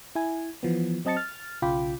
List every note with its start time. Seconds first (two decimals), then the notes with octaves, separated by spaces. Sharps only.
0.15 E4 G#5
0.63 E3 F3 B3
1.05 F#3 C4 D#5 A5 A6 C#7
1.17 F6 A6
1.62 B1 C#3 F4 G5 B5 D6